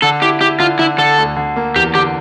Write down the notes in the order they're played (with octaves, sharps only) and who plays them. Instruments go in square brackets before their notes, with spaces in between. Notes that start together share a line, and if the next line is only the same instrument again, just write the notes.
[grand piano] D3 [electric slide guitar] A4
[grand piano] E4 [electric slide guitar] G4
[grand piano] E4 [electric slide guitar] G4
[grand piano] D3 [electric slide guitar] F4
[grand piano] D3 [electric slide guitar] E4
[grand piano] D3 [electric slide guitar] A4
[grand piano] D2
D3
A#3
[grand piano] E2 [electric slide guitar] G4
[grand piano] D3 [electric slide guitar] G4